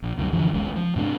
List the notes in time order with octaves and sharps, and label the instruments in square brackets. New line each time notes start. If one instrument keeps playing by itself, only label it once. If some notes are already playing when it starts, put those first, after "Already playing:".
[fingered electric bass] A#1
G1 C#2 G2 F#3
F#2 D3 E3 F3
E1 B1 C#3 G#3
F3
G#2 C3 A3 D4